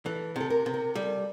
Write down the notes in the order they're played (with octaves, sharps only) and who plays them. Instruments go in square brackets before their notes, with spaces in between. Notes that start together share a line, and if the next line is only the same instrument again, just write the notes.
[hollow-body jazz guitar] E3 [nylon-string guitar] A4
[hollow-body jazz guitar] C3 [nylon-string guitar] A4
[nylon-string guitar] A#4
[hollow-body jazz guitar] C3
[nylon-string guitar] A#4
[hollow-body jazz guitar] G3 [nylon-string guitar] A4